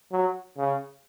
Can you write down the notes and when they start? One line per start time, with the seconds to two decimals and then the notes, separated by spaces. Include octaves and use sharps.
0.12 F#3
0.58 C#3